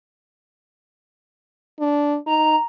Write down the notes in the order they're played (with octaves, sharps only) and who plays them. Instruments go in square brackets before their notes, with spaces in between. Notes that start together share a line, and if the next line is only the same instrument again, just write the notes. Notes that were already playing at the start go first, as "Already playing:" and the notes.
[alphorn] D4
[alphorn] D#4 [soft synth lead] A#5